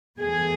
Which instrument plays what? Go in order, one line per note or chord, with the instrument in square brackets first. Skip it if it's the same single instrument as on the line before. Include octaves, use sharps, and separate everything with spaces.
[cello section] E2 B2 A3 G#4